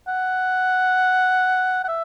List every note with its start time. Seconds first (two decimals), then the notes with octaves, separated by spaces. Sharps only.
0.08 F#5
1.84 F#5
1.88 E5